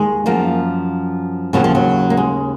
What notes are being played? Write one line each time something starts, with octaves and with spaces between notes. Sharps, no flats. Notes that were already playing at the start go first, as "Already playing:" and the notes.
Already playing: D#2 D#3 G#3
F#2 F3 A#3
D#2 C#3 F3 F#3
F3
F#3
A#3
G#3